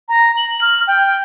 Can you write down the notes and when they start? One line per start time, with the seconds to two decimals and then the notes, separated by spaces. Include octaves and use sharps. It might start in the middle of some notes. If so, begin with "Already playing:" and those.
0.09 A#5
0.37 F#7
0.61 F6
0.88 G5